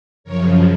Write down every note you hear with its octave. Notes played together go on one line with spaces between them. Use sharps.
F#2 C#3 F3 A#4 C#5